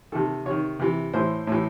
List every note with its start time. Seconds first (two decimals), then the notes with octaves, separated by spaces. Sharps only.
0.12 C3 D#3 A4
0.46 C3 D#3 C#5
0.79 C3 E3
1.13 A2 E3 C5
1.47 A2 E3